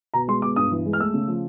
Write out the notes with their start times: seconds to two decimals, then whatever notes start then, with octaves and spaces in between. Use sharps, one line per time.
0.14 B2 A#5
0.28 G#3 C6
0.42 B2 D6
0.56 G2 D#6
0.72 E3
0.86 G#3
0.93 F6
0.99 A3 E6
1.14 C#3
1.28 F3